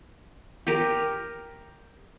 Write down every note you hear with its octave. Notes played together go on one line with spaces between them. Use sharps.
G4 A#4